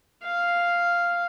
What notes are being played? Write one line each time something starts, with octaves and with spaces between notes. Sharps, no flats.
F5